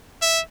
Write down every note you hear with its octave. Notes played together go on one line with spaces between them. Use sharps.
E5